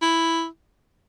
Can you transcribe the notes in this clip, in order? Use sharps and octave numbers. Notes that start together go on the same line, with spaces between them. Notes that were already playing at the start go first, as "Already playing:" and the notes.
E4